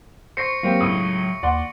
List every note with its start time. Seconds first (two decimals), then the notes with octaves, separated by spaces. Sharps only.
0.37 C5 C#6 A#6 C7 C#7
0.63 F#3 A#3 C4 G4
0.80 C#2 A2 D#6
1.43 D#2 D5 F#5 C6